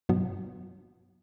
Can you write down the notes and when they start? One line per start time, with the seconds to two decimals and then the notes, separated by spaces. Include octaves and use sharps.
0.09 G2 B2 F#3 B3